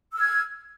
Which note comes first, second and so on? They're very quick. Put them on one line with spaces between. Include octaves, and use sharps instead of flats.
E6 F6 G#6